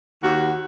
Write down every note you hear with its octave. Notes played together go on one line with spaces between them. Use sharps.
D#2 F#4